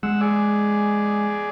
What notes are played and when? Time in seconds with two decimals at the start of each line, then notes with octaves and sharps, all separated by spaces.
0.03 G#3 F#5 E6
0.21 G#4 D5